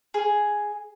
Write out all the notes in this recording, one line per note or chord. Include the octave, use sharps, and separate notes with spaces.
G#4